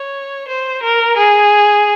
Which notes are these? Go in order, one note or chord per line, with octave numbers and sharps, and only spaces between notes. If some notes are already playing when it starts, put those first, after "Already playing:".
Already playing: C#5
C5
A#4
G#4